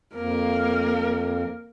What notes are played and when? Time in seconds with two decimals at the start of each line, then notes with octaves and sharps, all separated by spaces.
0.15 F2 A#3 A#4